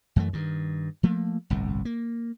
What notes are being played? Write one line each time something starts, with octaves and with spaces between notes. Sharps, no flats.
F#2 E3 A3
G2 D#3
F3 A3 A#3
G1 C2 A2
A#3